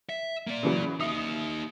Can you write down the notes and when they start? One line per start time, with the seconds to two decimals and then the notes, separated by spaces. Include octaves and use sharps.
0.09 E5
0.47 A#3 D5
0.63 C#3 E3 F#3
1.00 A#3 D#4 E5 D#6